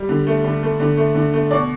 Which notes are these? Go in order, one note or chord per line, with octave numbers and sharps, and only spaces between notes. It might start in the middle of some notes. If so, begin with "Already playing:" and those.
Already playing: G3
D3
A3
D3
A3
D3
A3
D3
A3
B2 D5